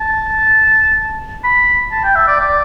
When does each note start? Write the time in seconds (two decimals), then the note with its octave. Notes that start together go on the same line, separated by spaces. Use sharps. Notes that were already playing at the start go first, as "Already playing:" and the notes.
0.01 A5
1.44 B5
1.92 A5
2.04 G5
2.16 E5
2.28 D5
2.40 D5